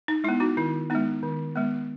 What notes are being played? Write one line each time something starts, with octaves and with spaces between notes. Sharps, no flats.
D#4
G#3 B3 E4
D#4 F#4
D#3 E4
G#3 B3 D#4
D#3
G#3 B3